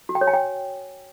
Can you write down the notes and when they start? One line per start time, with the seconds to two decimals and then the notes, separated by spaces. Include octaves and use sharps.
0.09 F#4
0.15 G5
0.21 C#5
0.27 G#5
0.34 G5